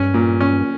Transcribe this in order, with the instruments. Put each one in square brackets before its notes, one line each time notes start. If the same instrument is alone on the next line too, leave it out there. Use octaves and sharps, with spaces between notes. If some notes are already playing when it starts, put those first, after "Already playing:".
Already playing: [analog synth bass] G2 [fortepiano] C#4
[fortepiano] A#2
C#4